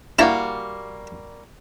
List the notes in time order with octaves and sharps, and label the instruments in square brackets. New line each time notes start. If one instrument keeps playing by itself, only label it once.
[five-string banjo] G3 A#3 F#4 [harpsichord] E4 A5 A#5